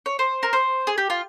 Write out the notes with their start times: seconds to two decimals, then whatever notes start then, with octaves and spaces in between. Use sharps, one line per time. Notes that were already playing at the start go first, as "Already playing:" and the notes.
0.06 C#5
0.19 C5
0.43 A#4
0.53 C5
0.87 G#4
0.98 G4
1.10 F4